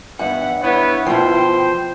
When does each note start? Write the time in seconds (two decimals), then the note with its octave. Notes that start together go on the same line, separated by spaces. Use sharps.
0.19 G2 B3 E5 F#5
0.62 B3 E4 B4 C#5
1.06 B2 F3 C5 G5